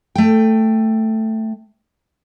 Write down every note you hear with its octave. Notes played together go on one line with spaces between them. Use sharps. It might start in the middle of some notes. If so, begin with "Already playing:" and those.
A3 G5